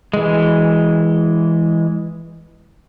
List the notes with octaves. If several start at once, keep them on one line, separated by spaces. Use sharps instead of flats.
E3 G#3